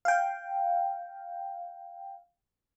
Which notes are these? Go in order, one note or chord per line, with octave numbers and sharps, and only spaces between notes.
F5 G5